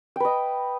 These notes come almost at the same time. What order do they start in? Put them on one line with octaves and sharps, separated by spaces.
G5 B4 D#5